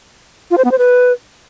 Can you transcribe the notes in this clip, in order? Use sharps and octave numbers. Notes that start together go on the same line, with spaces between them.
F4
C5
B3
C5
B4